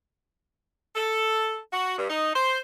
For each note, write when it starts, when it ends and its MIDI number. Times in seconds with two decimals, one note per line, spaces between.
0.95 1.57 69
1.73 1.98 66
1.98 2.07 43
2.10 2.33 63
2.35 2.60 72